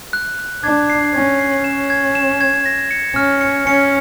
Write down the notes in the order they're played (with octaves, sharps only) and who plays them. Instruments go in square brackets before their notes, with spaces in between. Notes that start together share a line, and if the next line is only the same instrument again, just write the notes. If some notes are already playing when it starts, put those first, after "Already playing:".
[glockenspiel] F#6
F#6
[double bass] D4 [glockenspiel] G#6
[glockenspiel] C7
[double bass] C#4 [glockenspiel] G#6
[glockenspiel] C7
[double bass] C#4 [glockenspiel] E7
[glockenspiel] G#6
E7
G#6
A#6
C#7
[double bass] C#4 [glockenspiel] F6
[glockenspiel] C#7
[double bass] C#4 [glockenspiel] C#7